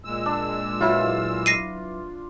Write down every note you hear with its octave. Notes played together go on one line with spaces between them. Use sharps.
A#2 G#3 E6
D4
F#3 E4 F4 B4
A#6 C7 D#7